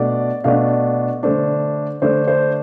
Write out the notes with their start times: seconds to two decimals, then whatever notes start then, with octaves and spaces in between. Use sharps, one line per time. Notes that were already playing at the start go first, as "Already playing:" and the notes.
Already playing: B2 A3 D4 D5
0.44 B2 A3 D4 F5
1.23 D3 A3 D4 C5
2.01 D3 A3 D4 C5
2.28 C5